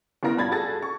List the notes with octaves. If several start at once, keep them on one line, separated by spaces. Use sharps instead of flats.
G1 B3 E4 A#4 A#6
G2 A#2 B5 G#6 A6
F#4 G#4 A4 A6 A#6
C#6